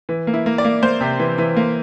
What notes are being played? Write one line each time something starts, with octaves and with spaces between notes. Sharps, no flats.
E3
A#3
E4
A#3
D5
A#3
A#3 C5
C3
E3
E3
A#3